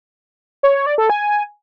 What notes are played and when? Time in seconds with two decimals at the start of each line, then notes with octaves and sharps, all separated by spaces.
0.63 C#5
0.75 C#5
0.86 D5
0.98 A4
1.10 G#5